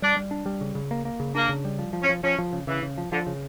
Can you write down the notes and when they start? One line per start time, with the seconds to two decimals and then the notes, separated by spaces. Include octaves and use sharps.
0.02 G3 D4
0.16 G3
0.31 D4
0.46 G3
0.61 C#3
0.75 C#3
0.91 A#3
1.05 A#3
1.20 C#3
1.35 A#3 D4
1.49 C#3
1.65 G3
1.79 F3
1.93 F3
2.02 C#4
2.09 F3
2.23 F3 C#4
2.39 F3
2.53 C#3
2.67 C#3 E3
2.83 C#3
2.98 F3
3.11 D3 F3
3.27 C#3